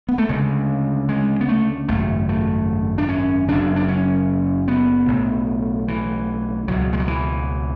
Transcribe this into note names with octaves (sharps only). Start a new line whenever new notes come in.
B3
A3
D2 C#3 G#3
G#3
B3
A3
G#1 F#2 C#3 A3
A3
D4
C#4
F#1 F#2 C#3 D4
D4
C#4
B3
B1 A2
E3
C#2 B2 F#3
G#3
F#3
E3